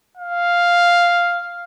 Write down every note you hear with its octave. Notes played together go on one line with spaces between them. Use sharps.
F5